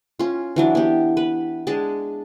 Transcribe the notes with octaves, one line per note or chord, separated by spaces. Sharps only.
C#4 F4
E3 F#3 D4
B3 G4
B4
G#3 D4 G#4 A5